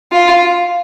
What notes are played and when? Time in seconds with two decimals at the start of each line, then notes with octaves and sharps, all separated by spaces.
0.12 F4